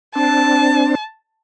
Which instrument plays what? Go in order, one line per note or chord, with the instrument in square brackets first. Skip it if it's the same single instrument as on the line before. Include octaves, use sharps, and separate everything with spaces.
[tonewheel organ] C4 D4 [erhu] A5